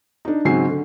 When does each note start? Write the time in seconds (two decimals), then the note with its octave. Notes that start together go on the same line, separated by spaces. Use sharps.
0.25 D4 D#4
0.45 G#2 C#3 F#3 C4 G#5 C7
0.69 D3